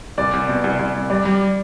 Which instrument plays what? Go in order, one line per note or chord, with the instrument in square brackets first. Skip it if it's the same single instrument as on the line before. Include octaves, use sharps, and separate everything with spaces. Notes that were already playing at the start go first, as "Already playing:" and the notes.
[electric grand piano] C2 [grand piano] D5
[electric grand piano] C2
B2
C2
C2
C2
[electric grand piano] G3 [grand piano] D5
[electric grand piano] G3